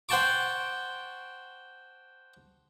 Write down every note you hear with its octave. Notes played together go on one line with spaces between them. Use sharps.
C5 F#5 G5 A5 C#6 D6